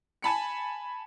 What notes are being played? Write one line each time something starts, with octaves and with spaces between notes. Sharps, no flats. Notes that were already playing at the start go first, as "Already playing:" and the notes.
G#5 A5 B5 C#7